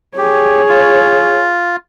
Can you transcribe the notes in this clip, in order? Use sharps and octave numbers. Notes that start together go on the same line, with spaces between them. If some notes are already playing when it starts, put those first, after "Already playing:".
G4 G#4 C#5
F4